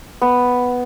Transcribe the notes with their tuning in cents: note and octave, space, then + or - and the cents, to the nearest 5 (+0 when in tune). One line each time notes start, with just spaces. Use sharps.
B3 +0